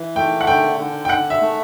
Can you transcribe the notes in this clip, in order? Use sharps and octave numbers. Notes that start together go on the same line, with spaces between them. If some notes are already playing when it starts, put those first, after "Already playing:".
Already playing: E3
A3 G5
F#5
D3 G5
D3
G5
D3 F#5
E5
A3